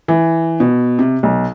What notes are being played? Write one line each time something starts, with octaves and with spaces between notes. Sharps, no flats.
E3
B2
C3
B1